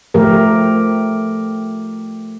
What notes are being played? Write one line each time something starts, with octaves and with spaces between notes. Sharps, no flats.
F3 A3 G4 A#4